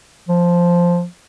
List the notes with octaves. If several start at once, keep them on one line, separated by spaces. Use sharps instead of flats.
F3